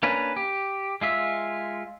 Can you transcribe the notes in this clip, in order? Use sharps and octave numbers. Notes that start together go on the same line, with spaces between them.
A#3 C#4 D4 B4
G4
G#3 F4 E5